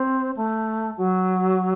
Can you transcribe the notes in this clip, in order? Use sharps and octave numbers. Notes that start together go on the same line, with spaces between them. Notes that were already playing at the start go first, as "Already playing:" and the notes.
Already playing: C4
A3
F#3